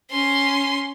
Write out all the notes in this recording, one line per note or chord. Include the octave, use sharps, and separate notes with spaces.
C#4 C6